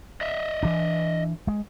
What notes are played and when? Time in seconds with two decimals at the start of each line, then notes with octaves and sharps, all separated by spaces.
0.21 D#5 E5
0.63 E3 D4
1.47 G#3